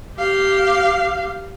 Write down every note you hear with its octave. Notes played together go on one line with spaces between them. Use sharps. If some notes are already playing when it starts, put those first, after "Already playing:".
G4 F5